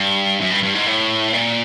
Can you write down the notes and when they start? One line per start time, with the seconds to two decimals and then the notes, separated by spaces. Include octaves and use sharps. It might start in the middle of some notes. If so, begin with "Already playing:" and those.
Already playing: G2
0.40 F#2
0.51 G2
0.63 G2
0.75 G#2
0.86 A2
1.33 A#2